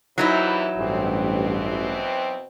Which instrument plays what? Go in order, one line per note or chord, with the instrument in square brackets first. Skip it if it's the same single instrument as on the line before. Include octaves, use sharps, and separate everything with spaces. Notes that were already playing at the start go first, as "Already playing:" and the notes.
[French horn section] E2 C3 E3 [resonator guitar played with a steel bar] F#3 D#4 E4
[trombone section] A1 G2 [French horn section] B2 E3 C4